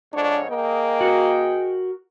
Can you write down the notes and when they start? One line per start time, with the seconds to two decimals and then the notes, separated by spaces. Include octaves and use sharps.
0.14 F2 G#2 D4 C#5
0.49 A#3 G#4 D#5 G5
1.01 F#4 A#4